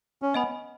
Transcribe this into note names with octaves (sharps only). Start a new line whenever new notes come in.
C#4
B3 D#5 G#5 B5